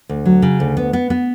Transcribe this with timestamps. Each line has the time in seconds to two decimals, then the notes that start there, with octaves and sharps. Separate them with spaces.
0.09 D2
0.25 F#3
0.42 C#3
0.60 D2
0.77 B3
0.93 B3
1.10 B3